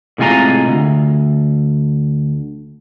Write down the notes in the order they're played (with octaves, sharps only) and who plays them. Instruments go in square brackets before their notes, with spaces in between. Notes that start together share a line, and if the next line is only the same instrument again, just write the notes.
[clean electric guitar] A2 C3 G#3 F4 G#5 A#5
D2